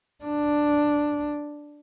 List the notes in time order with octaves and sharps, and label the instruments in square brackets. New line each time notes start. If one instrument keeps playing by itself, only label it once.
[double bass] D4